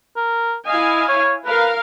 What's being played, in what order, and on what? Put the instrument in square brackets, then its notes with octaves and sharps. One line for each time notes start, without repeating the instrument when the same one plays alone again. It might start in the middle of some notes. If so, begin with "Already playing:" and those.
[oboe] A#4
[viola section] E4 F5 G#5 [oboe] D#5
[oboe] C#5
[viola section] A#4 F5 [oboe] B4